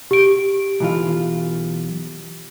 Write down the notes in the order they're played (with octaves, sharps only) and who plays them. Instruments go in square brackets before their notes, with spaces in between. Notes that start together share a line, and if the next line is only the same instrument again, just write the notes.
[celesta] G4 D7
[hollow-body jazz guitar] B1 E3 F4